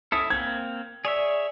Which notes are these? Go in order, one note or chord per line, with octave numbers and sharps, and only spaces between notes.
C#4 E4 A4 D#6
A#3 C4 G#6
G#4 C#5 D5 E5